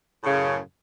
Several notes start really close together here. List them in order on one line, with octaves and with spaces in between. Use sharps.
A2 C#3 F#2